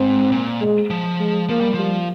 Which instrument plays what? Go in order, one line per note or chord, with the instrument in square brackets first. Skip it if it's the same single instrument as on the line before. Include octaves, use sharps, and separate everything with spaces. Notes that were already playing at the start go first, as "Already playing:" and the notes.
Already playing: [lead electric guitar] G#2 [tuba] C4
[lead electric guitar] A#2
[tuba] G#3
[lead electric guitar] F3
[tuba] G#3
[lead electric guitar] F3 [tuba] A#3
[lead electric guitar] G3
[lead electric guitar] F3 [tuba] G3